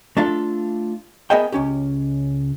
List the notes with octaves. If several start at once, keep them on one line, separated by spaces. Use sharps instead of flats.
A3 D4 F4 A4
B3 G#4 A#4 D#5 E5 G5
C#2 C#4 G4